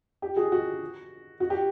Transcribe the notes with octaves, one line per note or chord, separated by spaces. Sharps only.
G4
F#4 G#4
F#4
F#4
G4